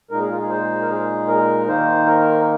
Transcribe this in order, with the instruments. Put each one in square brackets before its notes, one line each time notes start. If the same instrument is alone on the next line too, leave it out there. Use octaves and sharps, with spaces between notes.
[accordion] A#2 G#3 D#4 A#4
G#4
F4
G#4
C5
A#4
G#4
A#4
D#3 A#3 D#4 C5
A#4